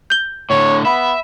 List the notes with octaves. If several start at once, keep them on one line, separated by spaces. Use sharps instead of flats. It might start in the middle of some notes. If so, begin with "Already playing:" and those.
G6 G7
A2 D3 C#5
B3 E5 B5